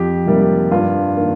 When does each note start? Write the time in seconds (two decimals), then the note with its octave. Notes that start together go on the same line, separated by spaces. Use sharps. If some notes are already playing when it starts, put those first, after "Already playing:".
Already playing: F2 G4
0.26 C3 D#3 G3 A#3
0.41 G4
0.71 G2 F4
1.16 D#3 A#3